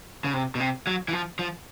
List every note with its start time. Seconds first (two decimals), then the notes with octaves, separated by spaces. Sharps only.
0.24 C#3
0.34 C3
0.55 B2
0.60 C3
0.87 F#3
1.08 E3
1.13 F3
1.39 F3